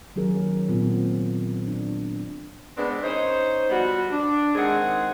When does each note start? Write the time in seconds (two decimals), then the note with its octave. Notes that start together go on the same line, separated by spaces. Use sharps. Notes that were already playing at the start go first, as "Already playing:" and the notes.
0.16 D#3 F#3 C#4 G#4 A#4
0.69 A#2 B3 C4 F4
1.67 D4
2.77 G#3 B3 C4 D4
3.03 C#4 D#4 C5
3.70 F3 G3 B3 F#4
4.11 D4
4.55 D#3 G#3 C4 G#4 F#5